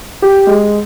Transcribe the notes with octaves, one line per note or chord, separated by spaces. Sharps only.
G4
G#3